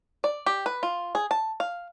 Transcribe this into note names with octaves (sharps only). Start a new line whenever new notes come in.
D5
G4
B4
F4
G#4
A5
F5